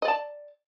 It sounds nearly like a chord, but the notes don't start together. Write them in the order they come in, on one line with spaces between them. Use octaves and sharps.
D#5 D5 A5